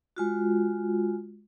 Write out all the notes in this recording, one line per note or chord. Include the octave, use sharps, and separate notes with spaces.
G#3 F4 F#4